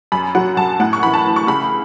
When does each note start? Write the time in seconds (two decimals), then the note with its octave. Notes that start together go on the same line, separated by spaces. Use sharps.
0.12 F#2 B5
0.35 F#3 F#5
0.57 F#2 A5
0.80 A2 F#5
0.93 C#6
1.03 E3 B5
1.14 A5
1.25 E3
1.36 C#6
1.47 C#2 B5